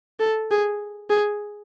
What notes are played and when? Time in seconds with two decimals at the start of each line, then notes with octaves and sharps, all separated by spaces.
0.20 A4
0.51 G#4
1.10 G#4